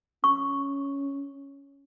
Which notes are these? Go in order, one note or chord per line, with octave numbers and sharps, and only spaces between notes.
C#4 C#6